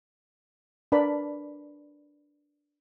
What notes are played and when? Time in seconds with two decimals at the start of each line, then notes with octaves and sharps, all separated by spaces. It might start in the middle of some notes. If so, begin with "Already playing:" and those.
0.92 D4 A#4 B4 D5 A5 B5